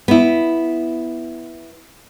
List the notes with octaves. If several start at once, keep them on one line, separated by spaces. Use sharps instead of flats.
B3 E4